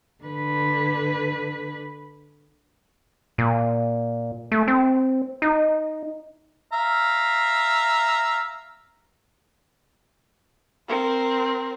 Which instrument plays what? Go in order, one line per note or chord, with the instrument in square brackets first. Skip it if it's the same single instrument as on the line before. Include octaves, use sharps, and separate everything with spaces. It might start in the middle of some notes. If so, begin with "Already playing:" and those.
[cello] D3 B4
[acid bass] A#2
A3
C4
D#4
[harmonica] E5 F5 A#5
[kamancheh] C4 A#4